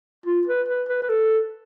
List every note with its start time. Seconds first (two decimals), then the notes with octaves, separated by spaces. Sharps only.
0.26 F4
0.47 B4
0.68 B4
0.89 B4
1.02 B4
1.09 A4